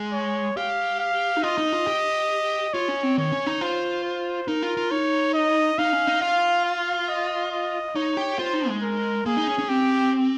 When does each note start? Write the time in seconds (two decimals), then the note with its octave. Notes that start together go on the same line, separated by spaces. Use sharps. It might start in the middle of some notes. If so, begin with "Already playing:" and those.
Already playing: G#3
0.13 C#5
0.57 G4 F5
1.00 F5
1.37 D#4
1.43 F4 D#5
1.58 D#4
1.73 F4
1.87 G4
2.74 F4 C#5
2.88 C#4
3.03 C4
3.18 D#3 C#5
3.32 C#4
3.46 D#4
3.61 F4 C5
4.04 C5
4.48 D#4 A#4
4.62 F4
4.77 F4
4.91 D#4 C#5
5.34 D#5
5.79 D#4 F5
5.93 C#4
6.07 D#4
6.21 F4 F5
6.65 F5
7.09 D#5
7.52 D#5
7.95 D#4 C#5
8.17 G4
8.39 F4 C5
8.53 D#4
8.68 G#3
8.83 A#4
9.26 A#3 G#4
9.37 D#4
9.47 C#4
9.58 C#4
9.69 C4 G4